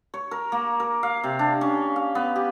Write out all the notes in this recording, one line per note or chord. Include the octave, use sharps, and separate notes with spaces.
C#5
A#4
A#3
A#4
F5
C3
D4
C#4
F5
B3
G4